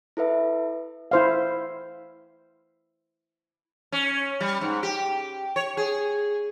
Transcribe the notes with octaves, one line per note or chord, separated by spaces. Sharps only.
E4 A4 B4 E5
E4 C5 F5
C#4
G3
G#2
G4
C#5
G#4